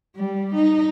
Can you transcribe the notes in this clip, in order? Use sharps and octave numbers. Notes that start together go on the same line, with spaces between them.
G3
D#4